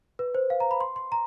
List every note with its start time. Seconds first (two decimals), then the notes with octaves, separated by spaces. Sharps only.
0.19 B4
0.35 C5
0.50 F5
0.60 A#5
0.71 B5
0.81 C6
0.96 C6
1.12 A#5